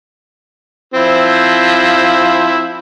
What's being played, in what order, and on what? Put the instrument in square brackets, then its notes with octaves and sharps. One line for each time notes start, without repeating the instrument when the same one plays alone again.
[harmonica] F3 C4 E4